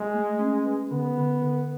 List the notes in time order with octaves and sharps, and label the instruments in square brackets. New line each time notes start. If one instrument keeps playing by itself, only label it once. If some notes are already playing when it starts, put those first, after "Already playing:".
Already playing: [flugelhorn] G#3
[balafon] A3
C#4
B4
[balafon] D3 [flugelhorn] B3
[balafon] D3
D3